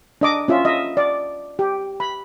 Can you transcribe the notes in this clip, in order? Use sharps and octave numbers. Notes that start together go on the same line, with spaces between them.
D4 D#5 D6
C#4 F4 E5
D#5 E5
D5
G4
B5